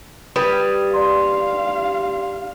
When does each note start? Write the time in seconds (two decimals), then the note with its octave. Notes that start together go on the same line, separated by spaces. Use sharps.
0.36 G3 B4 D#6 G#6 D#7
0.94 D5 F5 A#5 C6